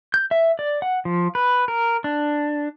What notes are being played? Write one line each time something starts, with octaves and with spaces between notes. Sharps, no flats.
G6
E5
D5
F#5
F3
B4
A#4
D4